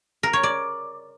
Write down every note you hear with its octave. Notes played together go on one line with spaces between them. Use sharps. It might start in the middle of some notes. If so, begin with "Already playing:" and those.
A#4
C#5
D5